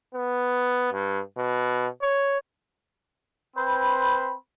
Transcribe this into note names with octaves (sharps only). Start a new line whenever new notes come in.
B3
G2
B2
C#5
C4 B4 C5 B5